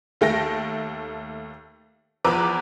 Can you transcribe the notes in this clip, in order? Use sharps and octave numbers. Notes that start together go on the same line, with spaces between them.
D#2 A3 G5 A#6
E2 F3 B4 A#5 D6 E6